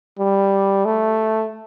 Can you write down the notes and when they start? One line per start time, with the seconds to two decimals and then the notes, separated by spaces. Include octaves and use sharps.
0.19 G3
0.85 A3